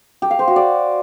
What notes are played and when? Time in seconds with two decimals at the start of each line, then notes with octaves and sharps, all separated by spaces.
0.22 G4
0.31 F5
0.39 C5
0.48 F#4
0.56 D5